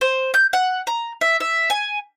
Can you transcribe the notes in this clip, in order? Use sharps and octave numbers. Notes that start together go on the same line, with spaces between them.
C5
G6
F#5
A#5
E5
E5
G#5